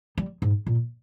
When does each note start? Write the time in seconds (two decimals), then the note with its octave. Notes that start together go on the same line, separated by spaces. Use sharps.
0.18 G3
0.42 G#2
0.67 A#2